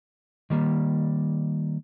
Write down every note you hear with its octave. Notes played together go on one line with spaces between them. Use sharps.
D#3 G3 A#3